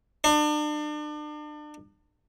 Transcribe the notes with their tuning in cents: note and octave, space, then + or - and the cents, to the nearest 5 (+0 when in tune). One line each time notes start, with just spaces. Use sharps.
D4 +40